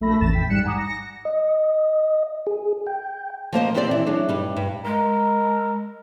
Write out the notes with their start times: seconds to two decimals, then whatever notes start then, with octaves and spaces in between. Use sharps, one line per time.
0.01 A#1 A3 E5 B5 A#6
0.20 A1 E2 A6 E7
0.33 G5 B6
0.50 G#2 G3 F#6 C#7 E7
0.63 F#5 G#5 A#5 D6 D#6
0.77 A#6 C#7
1.25 D#5
2.47 G#4
2.87 G5
3.53 F3 A#3 C5 D#5
3.74 B3 C4 E4 G4 C5 D5
3.91 E3
4.06 F#3 D4 G#4
4.29 G2 G3 D#4
4.56 G2
4.85 G#3 A#4